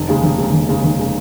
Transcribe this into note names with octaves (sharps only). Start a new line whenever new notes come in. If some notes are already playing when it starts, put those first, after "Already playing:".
Already playing: F1
D#2 C#3 G#3
F1
D#2 C#3 G#3
F1
D#2 C#3 G#3
F1
C#3 G#3